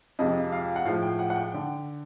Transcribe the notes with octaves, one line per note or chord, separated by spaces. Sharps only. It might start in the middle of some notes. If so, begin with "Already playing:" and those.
F2 C3 F3 G#3 D#5
F5
F#5
A2 F3 G#3 F5
G5
F#5
F#5
G5
D3 G5